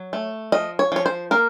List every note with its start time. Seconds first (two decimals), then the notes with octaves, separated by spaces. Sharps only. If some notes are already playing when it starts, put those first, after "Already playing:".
Already playing: F#3
0.13 A3
0.52 F3 D#5
0.79 C#5
0.92 F3 C#5
1.06 C5
1.31 A#3 A#4